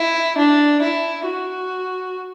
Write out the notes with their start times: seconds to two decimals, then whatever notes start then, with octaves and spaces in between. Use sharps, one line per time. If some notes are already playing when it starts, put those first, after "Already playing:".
Already playing: E4
0.38 D4
0.82 E4
1.26 F#4